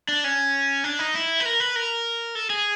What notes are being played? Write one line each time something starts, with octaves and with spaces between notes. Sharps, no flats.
D4
C#4
D4
D#4
E4
B4
A#4
B4
A#4
A4
G#4